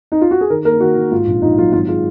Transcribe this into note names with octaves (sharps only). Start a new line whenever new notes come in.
D#4
F4
F#4
G#4
D#3 A#4
A#3 A#4
D#3 F#4
D#3
G#2 F4
A#1
A#1 D#4
F#3 F4
G#1 F4
G#3 F4